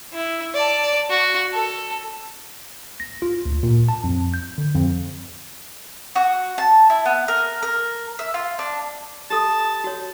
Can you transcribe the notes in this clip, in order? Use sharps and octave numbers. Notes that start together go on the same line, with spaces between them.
E4
D5 A5
F#4
A4
A#6
F4
D2
A#2
A5
F2
G6
D3
F2
F#4
A5
E4
B3
A#4
A#4
E5
F4
D4
G4 A4 A5 D#6
F#4 C#5